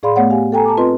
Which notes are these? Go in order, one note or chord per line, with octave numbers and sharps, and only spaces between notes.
A2 G#4 D5 F5 B5 C6
A3 B3 C#5 F#5
G4 F5 G#5
A4 G5 G#5 A#5
A5 A#5 D6
C4 F4 B4 D#5 C6